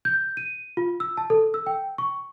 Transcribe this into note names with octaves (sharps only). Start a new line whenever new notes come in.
G6
D#7
F4
E6
A5
A4
E6
G5
C#6